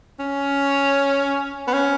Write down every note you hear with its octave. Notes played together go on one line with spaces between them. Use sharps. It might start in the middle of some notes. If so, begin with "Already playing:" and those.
C#4
B3
C#4